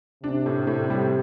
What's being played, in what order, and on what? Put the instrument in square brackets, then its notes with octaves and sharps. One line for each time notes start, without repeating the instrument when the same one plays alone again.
[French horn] C3 [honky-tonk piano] D4
[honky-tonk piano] A2
A2
G3